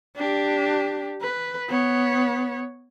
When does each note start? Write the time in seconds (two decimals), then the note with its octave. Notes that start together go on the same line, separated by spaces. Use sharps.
0.16 D4 G4
1.22 B4
1.68 B3 C#5